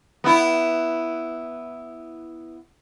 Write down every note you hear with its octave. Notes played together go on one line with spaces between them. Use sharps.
B3 E4